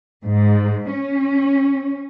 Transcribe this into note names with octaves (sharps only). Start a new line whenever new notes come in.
G#2
C#4